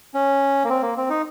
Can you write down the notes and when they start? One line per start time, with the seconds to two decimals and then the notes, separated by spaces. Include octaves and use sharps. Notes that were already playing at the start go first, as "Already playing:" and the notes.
0.14 C#4
0.64 A#3
0.70 C4
0.82 A#3
0.97 C4
1.10 D#4